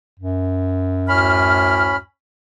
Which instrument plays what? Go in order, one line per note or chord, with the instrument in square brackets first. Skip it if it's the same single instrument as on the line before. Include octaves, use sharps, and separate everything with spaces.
[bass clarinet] F#2
[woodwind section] D2 A2 F6 [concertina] C#4 B5